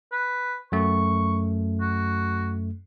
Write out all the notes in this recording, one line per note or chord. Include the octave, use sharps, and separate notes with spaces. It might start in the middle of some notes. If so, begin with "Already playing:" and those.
B4
F#2 A3 C#6
F#4